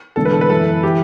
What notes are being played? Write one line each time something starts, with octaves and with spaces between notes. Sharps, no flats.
E1 E2 D3 A3 A4
B4
A4
B4
F#2 E3 B3 A4
E3 G4